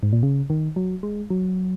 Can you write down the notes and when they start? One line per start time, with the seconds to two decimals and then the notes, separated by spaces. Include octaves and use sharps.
0.03 G#2
0.13 A#2
0.23 C#3
0.50 D#3
0.76 F#3
1.03 G#3
1.30 F#3